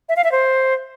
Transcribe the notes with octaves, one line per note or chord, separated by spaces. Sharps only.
E5
F5
E5
C5